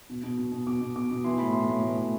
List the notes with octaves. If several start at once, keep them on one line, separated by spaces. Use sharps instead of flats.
B2
B2
B2
B2
B2 D6
B2
B2 D6
B2
E3 C6
A2 B5
A2 C6
A2
E3
A2